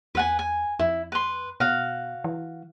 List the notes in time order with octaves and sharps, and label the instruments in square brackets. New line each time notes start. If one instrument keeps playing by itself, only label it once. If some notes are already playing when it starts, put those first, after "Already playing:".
[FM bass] E2 [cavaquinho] B4 F#5 G#5
[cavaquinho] G#5
[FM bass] F2 [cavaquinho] E4
[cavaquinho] B4 C6
[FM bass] B2 [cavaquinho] F#4 F5
[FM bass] E3